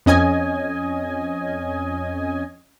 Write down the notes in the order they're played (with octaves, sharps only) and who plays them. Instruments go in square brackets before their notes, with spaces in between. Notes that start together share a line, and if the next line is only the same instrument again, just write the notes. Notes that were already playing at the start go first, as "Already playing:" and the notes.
[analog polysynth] F2 C#4 D#5 G#5